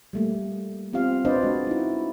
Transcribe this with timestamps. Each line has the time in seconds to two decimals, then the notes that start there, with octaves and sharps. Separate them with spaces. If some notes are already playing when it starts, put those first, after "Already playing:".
0.13 G3 A3 A#3
0.93 B3 C4 F4 G4 F5
1.25 D4 B4 C5 D5 D#5
1.42 G#3 F#4
1.67 D#4 E4